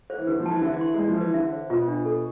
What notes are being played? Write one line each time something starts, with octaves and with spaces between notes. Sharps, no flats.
C5
E3
D3 B4
F3
A5
E3
D3 E5
E3
C6
G#3
D5
F3
E3 B4
D3 E5
C5
B2 F4
D4
A4